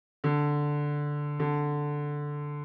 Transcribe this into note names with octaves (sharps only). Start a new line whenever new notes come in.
D3
D3